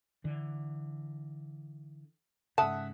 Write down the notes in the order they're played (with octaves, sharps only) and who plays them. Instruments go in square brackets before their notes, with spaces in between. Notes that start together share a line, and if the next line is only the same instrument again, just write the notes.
[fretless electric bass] D3 E3
[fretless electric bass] G#2 C#3 [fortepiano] E5 F#5 D#6 [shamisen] A5